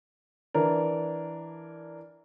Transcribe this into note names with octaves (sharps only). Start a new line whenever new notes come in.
E3 D4 A#4